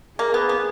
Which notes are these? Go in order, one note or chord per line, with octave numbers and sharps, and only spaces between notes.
A#3 G#4
B3
B3